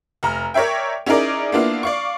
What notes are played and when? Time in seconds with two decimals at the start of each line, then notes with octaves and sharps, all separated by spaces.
0.23 F1 A#5 F6
0.54 A#4 C#5 D5 E5 G5
1.06 C#4 D#4 E4 G#4 A#4 D5
1.52 A#3 B3 D4 E4 F4
1.83 D5 F5 C#6